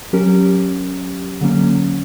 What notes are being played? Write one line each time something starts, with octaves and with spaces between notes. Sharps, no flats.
F#3 C#4 G4 A#4
D3 F#3 A#3 C#4